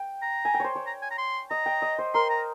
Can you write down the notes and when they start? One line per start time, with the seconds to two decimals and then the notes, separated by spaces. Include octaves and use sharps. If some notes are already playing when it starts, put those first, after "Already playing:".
Already playing: G5
0.22 A#5
0.45 G#5
0.54 G5
0.60 C5 C#5
0.76 C#5
0.87 A#5
1.02 G#5
1.11 A#5
1.18 C6
1.50 D#5 A#5
1.66 G5
1.82 D#5
1.99 C5
2.14 A#4 C6
2.30 A#5